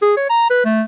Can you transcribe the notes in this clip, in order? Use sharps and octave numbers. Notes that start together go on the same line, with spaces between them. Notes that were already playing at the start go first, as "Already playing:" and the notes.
G#4
C#5
A#5
B4
A3